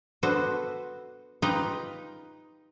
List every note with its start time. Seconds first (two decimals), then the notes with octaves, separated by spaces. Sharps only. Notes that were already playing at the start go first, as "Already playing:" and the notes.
0.23 B3 D4 F#4 A4 B4 C5
1.42 D#4 F4 G4 B4 D#5 G5